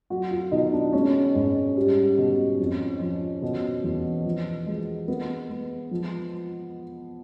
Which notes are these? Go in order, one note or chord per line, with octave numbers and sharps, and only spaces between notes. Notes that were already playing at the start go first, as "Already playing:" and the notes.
F#3 F#4
F4
B2 D#4
D4
G#3 C#4
G#2
G3
B2
F2
F3
B2
E2
F3
G#3
G#3 B3
G#3
F3